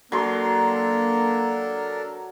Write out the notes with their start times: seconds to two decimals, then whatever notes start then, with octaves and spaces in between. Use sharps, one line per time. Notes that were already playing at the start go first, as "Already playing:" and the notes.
0.12 F#3 A#3 D4 A4 A#4 C6